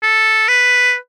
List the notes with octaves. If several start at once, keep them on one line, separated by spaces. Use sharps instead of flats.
A4
B4